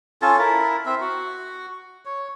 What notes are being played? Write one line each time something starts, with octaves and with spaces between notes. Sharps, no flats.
C#4 F4 A4 A5
E4 A#4
C4 E5
F#4
C#5